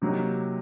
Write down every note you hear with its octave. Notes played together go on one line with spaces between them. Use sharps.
C3 F#3 A#3 D#4